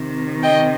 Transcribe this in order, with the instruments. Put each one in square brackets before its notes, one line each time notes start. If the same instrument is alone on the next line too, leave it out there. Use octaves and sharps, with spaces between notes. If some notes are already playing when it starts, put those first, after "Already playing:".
Already playing: [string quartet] C3 D#3
D#5 G5